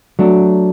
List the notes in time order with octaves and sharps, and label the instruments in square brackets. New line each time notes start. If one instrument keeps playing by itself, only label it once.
[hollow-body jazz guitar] F#3 A3 D4